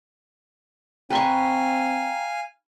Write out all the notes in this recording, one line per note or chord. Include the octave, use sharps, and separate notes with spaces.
C4 B4 F5 G5 G#5 A#5 C6 C#6